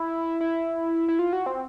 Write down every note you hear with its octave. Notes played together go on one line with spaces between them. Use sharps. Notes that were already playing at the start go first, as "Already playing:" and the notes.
Already playing: E4
E4
E4
F4
F#4
C4